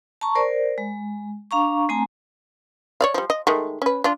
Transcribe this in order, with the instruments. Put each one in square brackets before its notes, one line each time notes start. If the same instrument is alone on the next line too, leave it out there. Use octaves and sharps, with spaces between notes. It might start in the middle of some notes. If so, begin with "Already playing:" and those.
[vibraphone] A5 A#5 C#6
A#4 C5 D5
G#3
D4 F5 A#5 C#6
A3 C4 G#5 A#5
[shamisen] C#5 D5 F5
F3 G3
D#5
D#3 G#3 A3
C#4 B4
D4 F4